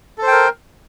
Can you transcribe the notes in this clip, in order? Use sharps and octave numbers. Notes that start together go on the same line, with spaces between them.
A4 A#4 C5 G5